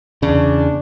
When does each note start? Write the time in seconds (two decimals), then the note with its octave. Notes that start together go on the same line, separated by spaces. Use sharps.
0.22 E2 C#3 D4